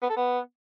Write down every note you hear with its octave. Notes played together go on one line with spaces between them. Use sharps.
B3
A4
B3